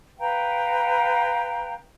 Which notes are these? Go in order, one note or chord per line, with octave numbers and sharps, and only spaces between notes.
B4 F5 G5 A#5